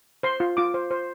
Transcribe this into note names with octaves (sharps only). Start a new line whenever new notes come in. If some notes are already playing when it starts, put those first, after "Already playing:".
C5 C6
F4
F4 D6
C5
C5